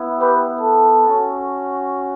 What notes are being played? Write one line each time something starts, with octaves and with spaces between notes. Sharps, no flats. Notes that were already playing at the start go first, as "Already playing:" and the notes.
Already playing: B3 E4
G4 B4
A4
C#4 F#4